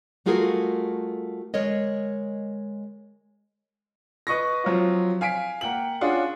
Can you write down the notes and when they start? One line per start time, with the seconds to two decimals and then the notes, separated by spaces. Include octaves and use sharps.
0.26 G3 A3 F4 F#4 G#4 A#4
1.54 G#3 A#4 C#5 D#5
4.27 B4 D#5 C#6 A#6
4.64 F3 F#3 C4 F4
5.21 F5 G#5 B6 D7
5.61 A#3 F#5 G5 F#7
6.01 C#4 D4 F4 G#4 F#5 C6